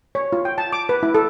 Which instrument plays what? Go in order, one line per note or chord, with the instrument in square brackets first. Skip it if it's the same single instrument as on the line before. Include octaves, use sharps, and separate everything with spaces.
[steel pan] C#5
F4
G5
A5
D6
B4
E4
A4